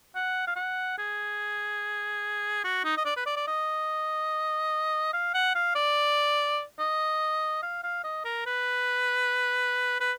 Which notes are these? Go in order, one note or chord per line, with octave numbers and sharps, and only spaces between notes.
F#5
F5
F#5
G#4
F#4
D#4
D#5
D5
B4
D5
D5
D#5
F5
F#5
F5
D5
D#5
F5
F5
D#5
A#4
B4
B4